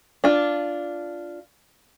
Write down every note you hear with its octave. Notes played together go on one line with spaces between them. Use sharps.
D4 F4